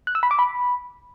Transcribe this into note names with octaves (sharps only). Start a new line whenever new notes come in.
F#6
E6
B5
D6
B5